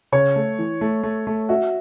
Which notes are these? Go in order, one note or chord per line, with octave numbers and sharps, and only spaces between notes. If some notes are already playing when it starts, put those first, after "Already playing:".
C#3 C#5
A3
E3
A3
A3
A3
F#4 E5